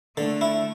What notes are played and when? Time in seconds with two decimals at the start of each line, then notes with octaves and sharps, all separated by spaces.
0.17 D3 A3
0.41 E4